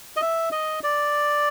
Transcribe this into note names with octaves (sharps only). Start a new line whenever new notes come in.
D#5
E5
D#5
D5